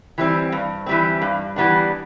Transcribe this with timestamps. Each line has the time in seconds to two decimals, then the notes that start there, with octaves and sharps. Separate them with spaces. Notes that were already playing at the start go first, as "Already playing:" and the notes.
0.18 E3 G3 C4
0.52 G2
0.86 E3 G3 C4
1.22 G2
1.56 E3 G3 B3 D4